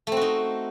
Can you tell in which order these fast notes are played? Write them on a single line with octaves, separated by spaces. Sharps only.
A3 C4 F#4 D#4